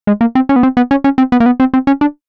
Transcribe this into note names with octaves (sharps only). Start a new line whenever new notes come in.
G#3
A#3
C4
C#4
B3
C4
B3
C#4
C#4
C4
B3
A#3
B3
C4
C4
C#4
D4